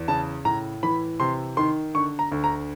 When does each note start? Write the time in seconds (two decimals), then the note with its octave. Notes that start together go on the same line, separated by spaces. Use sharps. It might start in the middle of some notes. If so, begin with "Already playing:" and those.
Already playing: E2
0.08 C#3 A5
0.45 A2 A#5
0.83 E3 B5
1.20 C3 C6
1.57 D#3 C6
1.94 D3 C#6
2.19 A#5
2.32 D2
2.44 A#5